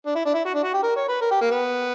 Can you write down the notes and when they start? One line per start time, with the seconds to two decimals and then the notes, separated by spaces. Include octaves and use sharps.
0.06 D4
0.15 E4
0.25 D4
0.34 E4
0.45 F#4
0.54 D4
0.64 F#4
0.73 G4
0.83 A#4
0.96 C#5
1.08 B4
1.21 A#4
1.31 G4
1.41 A#3
1.51 B3